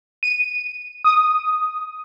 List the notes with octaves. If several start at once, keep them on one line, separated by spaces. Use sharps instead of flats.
D#7
D#6